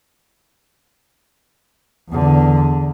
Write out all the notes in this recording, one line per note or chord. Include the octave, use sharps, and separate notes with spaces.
E2 D3